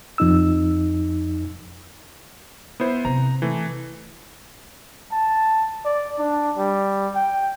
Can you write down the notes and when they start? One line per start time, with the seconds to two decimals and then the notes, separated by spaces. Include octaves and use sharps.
0.18 F2 D#4 E6
2.80 B3 E4 C5
3.05 C3 A#5
3.42 E3 A3
5.12 A5
5.85 D5
6.19 D4
6.58 G3
7.16 G5